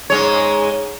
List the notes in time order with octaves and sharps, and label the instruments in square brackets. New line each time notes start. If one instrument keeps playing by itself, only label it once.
[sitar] G#2 G#3 C#5